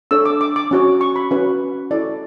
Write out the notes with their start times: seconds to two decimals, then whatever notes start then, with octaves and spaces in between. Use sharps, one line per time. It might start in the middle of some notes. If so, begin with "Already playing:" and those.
0.11 D4 A4 C#5 E6
0.26 D6
0.41 D6
0.56 D6
0.71 C#4 F#4 C#5
1.01 C#6
1.16 B5
1.31 C#4 F#4 B4
1.91 E4 A4 C#5 D5